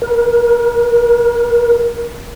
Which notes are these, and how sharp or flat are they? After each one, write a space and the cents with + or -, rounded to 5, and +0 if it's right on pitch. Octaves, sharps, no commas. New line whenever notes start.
A#4 +30